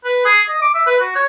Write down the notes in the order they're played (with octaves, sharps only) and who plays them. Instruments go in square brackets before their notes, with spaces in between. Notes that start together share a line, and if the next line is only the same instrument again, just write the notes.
[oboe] B4
G#4
D#5
D6
E5
B4
F#4
C#5